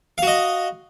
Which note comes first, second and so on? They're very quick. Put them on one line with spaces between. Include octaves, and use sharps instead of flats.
F5 F#4 D#5